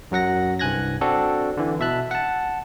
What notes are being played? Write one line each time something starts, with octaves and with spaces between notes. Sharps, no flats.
F#2 F#3 F#5 A#6
C2 G2 G#5 F#6 G#6 A#6
C4 D4 F#4 A4
D3 E3
B2 E5 A5 F#6
F#5 A5